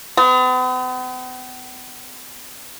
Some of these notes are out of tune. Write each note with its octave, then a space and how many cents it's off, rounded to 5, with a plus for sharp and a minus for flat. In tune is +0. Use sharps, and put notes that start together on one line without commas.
B3 +45